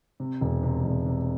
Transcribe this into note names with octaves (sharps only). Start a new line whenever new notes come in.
C3
E1
C3
E1
C3